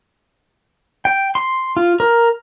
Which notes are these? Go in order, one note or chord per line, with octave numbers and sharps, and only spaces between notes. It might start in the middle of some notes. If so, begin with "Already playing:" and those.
G5
C6
F4
A#4